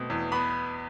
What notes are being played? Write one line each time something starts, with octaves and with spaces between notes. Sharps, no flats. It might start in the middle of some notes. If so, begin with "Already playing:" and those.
Already playing: B2 A3 C4
E2
B3 B5